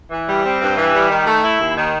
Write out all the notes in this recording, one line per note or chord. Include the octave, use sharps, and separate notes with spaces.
E3
G3
C4
G2
E3
G3
D#3
A3
E4
D#2
D#3